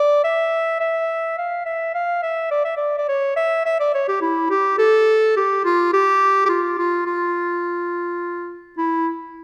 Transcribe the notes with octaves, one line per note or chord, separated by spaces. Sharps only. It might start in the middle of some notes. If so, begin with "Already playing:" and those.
Already playing: D5
E5
E5
F5
E5
F5
E5
D5
E5
D5
D5
C#5
E5
E5
D5
C#5
G4
E4
G4
A4
G4
F4
G4
G4
F4
F4
F4
E4